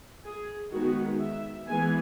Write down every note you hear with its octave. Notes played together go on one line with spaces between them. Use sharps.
G#4
D#3 G#3 B3 F#4
E5
E3 G#3 B3 G#5